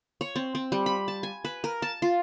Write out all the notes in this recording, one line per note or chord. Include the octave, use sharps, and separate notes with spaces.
C#5
C4
C4
G3
B5
A5
G#5
B4
A#4
A5
F4